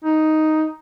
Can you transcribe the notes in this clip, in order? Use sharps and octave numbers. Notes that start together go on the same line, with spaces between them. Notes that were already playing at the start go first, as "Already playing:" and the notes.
D#4